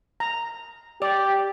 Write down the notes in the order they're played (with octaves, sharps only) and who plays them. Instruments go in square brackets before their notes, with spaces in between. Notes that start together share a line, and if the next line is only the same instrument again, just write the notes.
[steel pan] A#5
[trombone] G4 [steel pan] D5